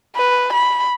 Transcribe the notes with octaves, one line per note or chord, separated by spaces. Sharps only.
B4
B5